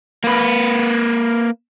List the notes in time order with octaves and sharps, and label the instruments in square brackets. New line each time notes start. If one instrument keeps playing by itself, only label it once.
[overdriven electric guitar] A#3 B4